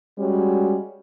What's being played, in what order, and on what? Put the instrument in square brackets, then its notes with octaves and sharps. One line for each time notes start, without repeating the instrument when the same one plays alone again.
[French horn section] G3 G#3 C#4 F#4